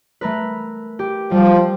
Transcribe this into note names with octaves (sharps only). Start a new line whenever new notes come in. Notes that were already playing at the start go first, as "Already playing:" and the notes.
A3 A#4 B4
G4
F3 G3 G4